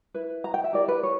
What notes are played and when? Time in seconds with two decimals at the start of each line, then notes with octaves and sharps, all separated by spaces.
0.14 E4 B4
0.44 A#5
0.54 G5
0.64 E5
0.73 E4 G4 A#4 D5
0.88 B4
1.03 C#5